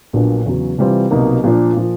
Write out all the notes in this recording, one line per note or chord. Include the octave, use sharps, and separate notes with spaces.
A#1 A#2 F#3 B3 D4
E2 C#3 F#3
C3 E3 G3 C4 F4
C2 B2 F#3 A#3 D#4
A#2 F3 A#3 D4
A#2 F3